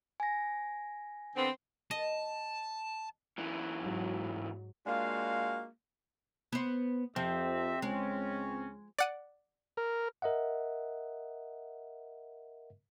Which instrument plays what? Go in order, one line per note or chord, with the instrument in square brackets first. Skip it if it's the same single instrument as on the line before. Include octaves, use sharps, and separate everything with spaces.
[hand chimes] G#5 A#6
[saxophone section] D3 B3 C4
[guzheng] D#5 [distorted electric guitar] A5
[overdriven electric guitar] F#2 E3
[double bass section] G#2 F#3
[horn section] G#3 A#3 D4 F4 F#4 F5
[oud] B3 C5
[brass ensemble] F2 G4 E5 [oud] F3 [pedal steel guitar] C4
[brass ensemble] C#2 C#4 [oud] G#3
[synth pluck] D5 F#5 D#7
[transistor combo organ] A#4
[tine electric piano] A#4 D#5 E5 F#5